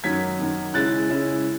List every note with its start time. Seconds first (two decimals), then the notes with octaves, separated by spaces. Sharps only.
0.04 F#2 D#3 F#3 G#6 B6
0.39 F#2 D#3 F#3
0.74 C#3 G#3 C#4 E4 F#6 A6
1.09 C#3 G#3 C#4 E4